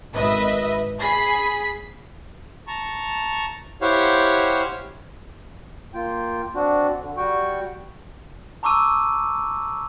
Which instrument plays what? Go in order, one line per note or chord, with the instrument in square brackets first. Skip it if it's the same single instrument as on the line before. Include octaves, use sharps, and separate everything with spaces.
[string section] G#1 B4 D#5 E5
G#4 B5 B6 C7
[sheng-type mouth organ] A5 A#5 C#6
E4 G4 C5 C#5 F5 F#5
[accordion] A#3 F4 G5
C4 D4 F#4
D3
G3 F#4 G5 C#6
[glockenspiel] A5 A#5 C#6 D6 E6 D#7